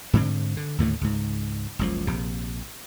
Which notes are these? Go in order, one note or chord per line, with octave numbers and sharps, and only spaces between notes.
G#2 D3 C4
D3
D#2 A2 D3 A3
C#2 G#2
F#1 C#2 F3
A#1 C3